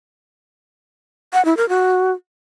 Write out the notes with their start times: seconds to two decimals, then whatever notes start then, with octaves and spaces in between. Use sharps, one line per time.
1.33 F#5
1.45 E4
1.57 A#4
1.69 F#4